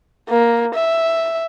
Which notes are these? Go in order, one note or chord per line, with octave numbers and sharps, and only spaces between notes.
A#3
E5